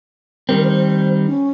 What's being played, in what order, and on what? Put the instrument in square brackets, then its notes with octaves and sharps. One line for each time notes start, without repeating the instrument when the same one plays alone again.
[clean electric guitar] D#3 G3 C4 [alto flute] A#4
[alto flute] C5
C#4